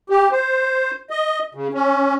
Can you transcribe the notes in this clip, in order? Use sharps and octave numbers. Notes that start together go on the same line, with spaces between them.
G4
C5
D#5
C#3
C#4